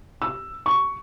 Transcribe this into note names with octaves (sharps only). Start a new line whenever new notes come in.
E6
C#6